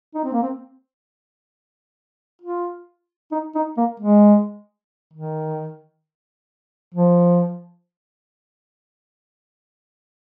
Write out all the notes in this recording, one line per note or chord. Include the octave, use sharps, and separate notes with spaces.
D#4
C4
A#3
C4
F4
D#4
D#4
A#3
G#3
D#3
F3